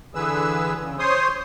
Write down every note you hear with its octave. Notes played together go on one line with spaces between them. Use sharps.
D3 E3 G#4 B4 E6
C#3
C5 C#5 C6 D#6